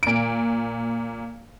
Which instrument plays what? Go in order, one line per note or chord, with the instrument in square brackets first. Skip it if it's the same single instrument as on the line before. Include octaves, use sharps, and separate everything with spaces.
[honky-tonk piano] A#2 D7